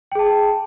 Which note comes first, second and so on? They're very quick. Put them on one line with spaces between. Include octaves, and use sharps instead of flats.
G5 G#4 A5